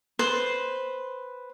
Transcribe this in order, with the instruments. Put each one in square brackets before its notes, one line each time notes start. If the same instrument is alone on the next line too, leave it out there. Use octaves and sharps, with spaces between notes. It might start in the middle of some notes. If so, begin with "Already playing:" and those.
[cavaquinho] B4 C5